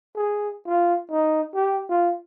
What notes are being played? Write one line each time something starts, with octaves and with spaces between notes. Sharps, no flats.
G#4
F4
D#4
G4
F4